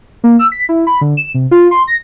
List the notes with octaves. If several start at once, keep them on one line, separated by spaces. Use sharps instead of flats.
A#3
E6
B6
E4
B5
D3
E7
C3
F4
C6
A#6